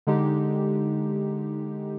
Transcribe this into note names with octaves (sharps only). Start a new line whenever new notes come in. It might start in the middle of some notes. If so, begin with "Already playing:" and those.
D3 G#3 D#4 G4